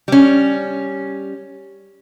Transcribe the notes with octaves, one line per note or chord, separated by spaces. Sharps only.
G3 C#4